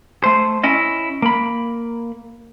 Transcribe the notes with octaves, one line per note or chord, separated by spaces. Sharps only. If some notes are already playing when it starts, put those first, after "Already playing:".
A3 C5
C#4 E4 D#5
A#3 B5